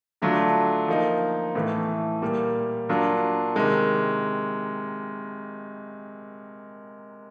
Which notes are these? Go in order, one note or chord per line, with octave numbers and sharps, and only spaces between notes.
D3 F#3 A3 D4 F4
F3 A#3 D#4
A2 E3 A3
A#2 G3 A#3
F#3 A#3 D4 F4
C3 D#3 G#3